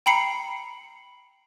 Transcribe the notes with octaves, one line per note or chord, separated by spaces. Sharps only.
G5 A#5 B5 C7 C#7